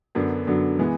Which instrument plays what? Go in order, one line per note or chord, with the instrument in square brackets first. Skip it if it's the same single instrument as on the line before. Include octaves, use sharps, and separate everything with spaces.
[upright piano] F#2 D3 F#3 B3 D4
F#2 D3 F#3 B3 D4
E3 G#3 B3